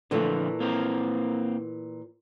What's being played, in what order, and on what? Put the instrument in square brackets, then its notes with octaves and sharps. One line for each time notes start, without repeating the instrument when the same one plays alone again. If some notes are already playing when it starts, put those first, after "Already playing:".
[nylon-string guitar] A#2 E3 A3 [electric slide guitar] D3 F3
[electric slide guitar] A#3 C4 A#4